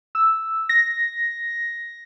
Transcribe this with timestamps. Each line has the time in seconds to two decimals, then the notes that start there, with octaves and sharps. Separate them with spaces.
0.15 E6
0.69 A#6